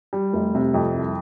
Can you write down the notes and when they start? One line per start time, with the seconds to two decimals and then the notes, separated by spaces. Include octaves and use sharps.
0.13 G3
0.33 F1
0.55 C3
0.74 F2
0.94 C2